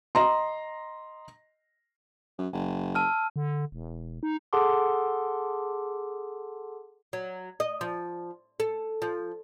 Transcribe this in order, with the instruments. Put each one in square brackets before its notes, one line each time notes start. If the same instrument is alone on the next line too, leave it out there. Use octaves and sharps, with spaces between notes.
[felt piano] D#5 A#5 C6
[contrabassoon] F#2
F#1
[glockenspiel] A5 E6 F6
[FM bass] D3
E1
D#4
[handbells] G#4 A4 F#5 A5 C6 D6
[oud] F#3
D#5
F3
A4
F3